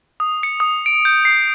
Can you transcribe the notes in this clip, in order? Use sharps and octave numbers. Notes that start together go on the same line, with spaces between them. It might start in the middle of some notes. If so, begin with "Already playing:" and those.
D#6
C#7
D#6
D7
G6
C7